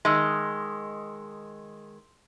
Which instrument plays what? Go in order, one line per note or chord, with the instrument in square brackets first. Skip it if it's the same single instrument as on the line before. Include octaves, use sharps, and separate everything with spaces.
[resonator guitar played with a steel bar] D#3 G#3 [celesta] C6 E6